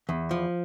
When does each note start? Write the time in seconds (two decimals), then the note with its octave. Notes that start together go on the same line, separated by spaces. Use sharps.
0.09 E2
0.31 F3